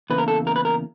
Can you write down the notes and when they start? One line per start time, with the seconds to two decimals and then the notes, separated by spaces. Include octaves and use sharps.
0.10 E2 C#3 A#3 B4
0.18 A#4
0.28 A4
0.47 A#4
0.56 B4
0.65 A#4